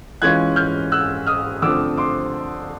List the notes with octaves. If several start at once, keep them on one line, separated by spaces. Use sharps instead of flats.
E3 G#3 C#4 F4 F#6 G#6
F6 G6
E6 F#6
D#6 F6
D3 F3 A3 C4 D6 E6
C6 D6